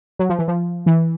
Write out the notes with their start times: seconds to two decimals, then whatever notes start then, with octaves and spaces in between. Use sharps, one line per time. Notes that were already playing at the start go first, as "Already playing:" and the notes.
0.19 F#3
0.30 F3
0.39 E3
0.48 F3
0.86 E3